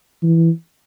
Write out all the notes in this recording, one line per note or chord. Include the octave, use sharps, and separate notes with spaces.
E3